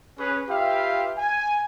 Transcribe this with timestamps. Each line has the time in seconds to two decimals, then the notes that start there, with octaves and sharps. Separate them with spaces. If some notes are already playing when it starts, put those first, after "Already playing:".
0.18 C#4 G#4 B4
0.49 F4 G4 B4 E5 F5 G5
1.18 G#5